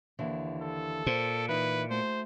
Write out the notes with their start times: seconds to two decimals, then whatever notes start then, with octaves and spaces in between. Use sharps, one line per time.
0.19 D#2 D3 E3
0.62 A4
1.06 A#2 C5
1.49 E3 D#4 B4
1.90 A3 F#4 C5